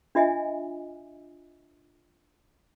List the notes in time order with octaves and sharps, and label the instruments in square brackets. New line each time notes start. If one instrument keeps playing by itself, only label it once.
[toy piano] D4 F4 D#5 E5 G#5